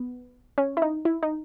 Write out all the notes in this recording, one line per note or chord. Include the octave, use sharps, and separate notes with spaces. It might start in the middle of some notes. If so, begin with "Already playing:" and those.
Already playing: B3
C#4
E4
D#4
E4
D#4